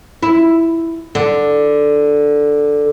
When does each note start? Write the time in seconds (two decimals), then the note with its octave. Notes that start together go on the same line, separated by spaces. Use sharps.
0.23 E4
1.15 D3